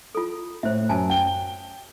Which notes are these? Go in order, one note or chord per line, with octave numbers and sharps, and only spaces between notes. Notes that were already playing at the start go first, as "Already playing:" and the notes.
F4 A4
A2 C5 E5
F#2 G#5 A5
G5 G7